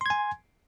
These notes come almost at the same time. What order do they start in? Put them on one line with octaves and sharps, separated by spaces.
C6 G#6 G#5